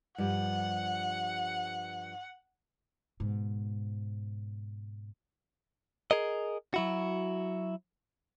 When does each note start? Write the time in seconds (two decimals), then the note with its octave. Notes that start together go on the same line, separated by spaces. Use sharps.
0.18 G2 F3 G3 F#5
3.20 G#2 B2
6.11 G#4 A#4 D#5
6.74 F#3 E4 F#4